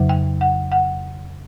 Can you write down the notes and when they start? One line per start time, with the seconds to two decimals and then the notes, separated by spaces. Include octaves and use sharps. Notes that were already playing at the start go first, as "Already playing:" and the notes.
Already playing: F2 C#3 F#3
0.09 G5
0.41 F#5
0.72 F#5